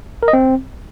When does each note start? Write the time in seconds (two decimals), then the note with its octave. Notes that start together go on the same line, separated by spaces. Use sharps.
0.23 A#4
0.28 D#5
0.33 C4